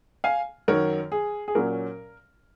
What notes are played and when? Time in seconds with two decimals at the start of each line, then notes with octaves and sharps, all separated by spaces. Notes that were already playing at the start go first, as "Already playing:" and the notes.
0.24 F5 G#5
0.68 F#2 D#3 F#3 A#4 C#5
1.12 G#4
1.48 G#4
1.55 A#2 F#3 C#4 A#4